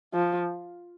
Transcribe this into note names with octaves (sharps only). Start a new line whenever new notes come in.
F3